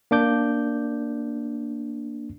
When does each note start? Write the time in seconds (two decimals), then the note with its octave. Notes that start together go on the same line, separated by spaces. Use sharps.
0.11 A#3 D4 D6 G6